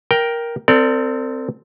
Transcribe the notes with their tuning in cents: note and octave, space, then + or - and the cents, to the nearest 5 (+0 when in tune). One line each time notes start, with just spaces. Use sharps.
A#4 +10 G5 +0
C4 -15 A4 +45 D5 +0